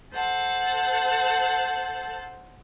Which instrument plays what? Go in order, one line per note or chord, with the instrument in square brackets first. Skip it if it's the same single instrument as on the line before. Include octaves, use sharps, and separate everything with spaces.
[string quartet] A4 C5 F#5 A5